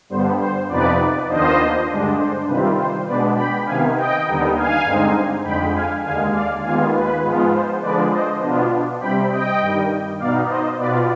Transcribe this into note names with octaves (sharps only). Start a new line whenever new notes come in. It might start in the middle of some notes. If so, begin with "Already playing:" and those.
G2 D3 G3 B3 C5
C5
F2 C3 F3 B3 D#4 B4 D5
D#2 D#3 B3 D4 F4 C5 D#5
G2 D3 G#3 D4
C5
C3 D#3 G3 C4 F4 B4
C5
B2 G#3 B3 D4 B4 D5
G5 B5
C3 D#3 B3 F5 G#5
D#5 G5
D#2 D3 G3 B3 D#4
F5 G#5
G2 D3 G#3 C4 D#4
F2 D3 G#3 G5 B5
F5 G#5
D#2 D3 G#3 F5 G#5
D5 F5
D#2 D#3 G#3 B3 F4 F5 G#5
B4
G#2 F3 G#3 B3 F4
C5
D3 F3 G#3 B4 D5
C5 D#5
B2 B3 D4 F4
C3 G3 C4 G5 B5
D#5 G5
G2 D#3 G3
B2 B3 D#4 D5 F5
C5 D#5
B2 B3 F4 B4 D5